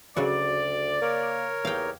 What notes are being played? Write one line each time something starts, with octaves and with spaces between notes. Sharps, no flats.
D2 C#3 F#3 F#4 D5
A#3 A#4 C#5
E2 A#3 D#4 G4 F5 G5